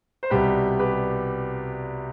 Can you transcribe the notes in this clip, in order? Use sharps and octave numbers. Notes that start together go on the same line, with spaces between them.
C5
C2 B2 G3 G4 B4
G4 B4